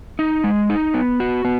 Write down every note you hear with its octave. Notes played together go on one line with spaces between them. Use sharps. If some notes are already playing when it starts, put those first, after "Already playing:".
D#4
G#3
D#4
B3
F#4
B3